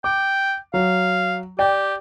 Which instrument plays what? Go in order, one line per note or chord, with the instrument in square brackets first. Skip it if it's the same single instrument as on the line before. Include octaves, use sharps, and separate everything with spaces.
[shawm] G5 [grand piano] D6
[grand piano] F#3 [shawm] F5
[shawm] G4 [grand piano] D5 G5